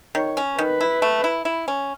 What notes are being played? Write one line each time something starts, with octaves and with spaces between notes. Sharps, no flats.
D#3 C#5
C#4
D#3 B4
E4
A3
E4
E4
C#4